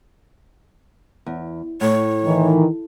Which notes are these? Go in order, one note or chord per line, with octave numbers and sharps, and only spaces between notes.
E2
A2 C#5
D#3 E3